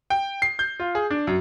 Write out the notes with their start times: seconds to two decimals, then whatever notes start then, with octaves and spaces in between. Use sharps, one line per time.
0.10 G5
0.42 C7
0.59 G6
0.80 F4
0.95 G#4
1.10 D4
1.27 F#2